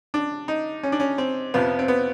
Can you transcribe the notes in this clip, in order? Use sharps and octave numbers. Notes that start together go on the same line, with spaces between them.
D4
D#4
C#4
D4
C#4
C4
F2 C3 F3 B3
C4
B3